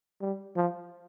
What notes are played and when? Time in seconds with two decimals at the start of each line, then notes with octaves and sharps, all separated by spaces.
0.21 G3
0.56 F3